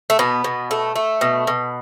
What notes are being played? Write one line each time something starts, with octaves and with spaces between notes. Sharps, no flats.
A3
B2 B3
B2
A3
A3
B2
B2